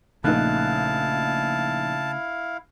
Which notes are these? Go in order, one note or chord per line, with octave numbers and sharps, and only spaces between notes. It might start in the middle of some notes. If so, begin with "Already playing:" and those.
A#1 C#3 A3 D#4 E4 F5 A5 F#6